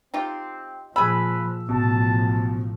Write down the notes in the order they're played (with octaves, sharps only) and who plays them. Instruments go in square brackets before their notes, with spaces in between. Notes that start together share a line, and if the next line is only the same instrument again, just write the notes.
[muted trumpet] C4 [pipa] D#4 F4 G4
[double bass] A#2 F3 [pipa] G#4 B5 [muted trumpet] B4 [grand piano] E6
[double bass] A1 F3 [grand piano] B2 [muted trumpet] A5